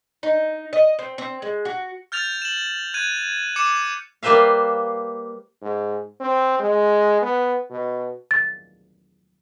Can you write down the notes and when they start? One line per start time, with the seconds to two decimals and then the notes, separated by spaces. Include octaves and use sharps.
0.23 D#4
0.73 D#5
0.99 C4
1.18 C4
1.42 G#3
1.65 F#4
2.12 F6 G6 A6 F7
2.42 E7 F#7
2.94 F#6 G#6 D#7
3.56 D6 C#7 E7
4.23 G3 A#3 B4 C5 E5 F5
5.62 G#2
6.20 C4
6.60 G#3
7.22 B3
7.71 B2
8.31 A6